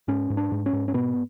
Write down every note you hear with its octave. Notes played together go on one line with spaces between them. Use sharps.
G#2 C#4
G#2
D4
G#2
C#4
G#2
C#4
B2 B3